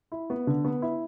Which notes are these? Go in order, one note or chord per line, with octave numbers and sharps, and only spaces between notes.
E4
B3
D3
B3
E4